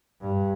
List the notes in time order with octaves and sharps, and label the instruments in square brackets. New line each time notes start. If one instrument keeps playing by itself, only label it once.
[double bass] G2